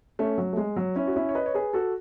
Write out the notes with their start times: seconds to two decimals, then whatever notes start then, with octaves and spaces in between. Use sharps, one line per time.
0.19 A3 C#4
0.38 F#3
0.53 A3
0.57 G#3
0.76 F#3
0.96 C#4 E4
1.07 F#4
1.16 C#4 E4
1.29 C#5
1.35 B4 D#5
1.46 C#5
1.54 G#4 B4
1.73 F#4 A4